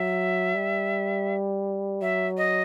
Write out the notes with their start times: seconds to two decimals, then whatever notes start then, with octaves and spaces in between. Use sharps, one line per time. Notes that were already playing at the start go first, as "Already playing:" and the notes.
Already playing: F#3 E5
0.55 G3
2.02 F#3 E5
2.37 D#5